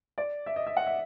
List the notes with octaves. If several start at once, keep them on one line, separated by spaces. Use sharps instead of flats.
D5
E5
D#5
E5
F#5
E5